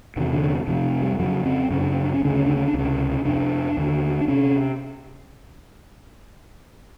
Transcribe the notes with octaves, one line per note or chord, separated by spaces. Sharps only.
E2 C3 D#3
D3
F2 C3 F3
G3
F2 C#3 F#3
C4
F#2 C#3 C#4
D4
C#4
D4
C#4
D2 C#3 D4
C#4
D4
C#4
D4
C#2 C3 C#4
F2 C3 D4
D#2 D3
D4
C3 C#4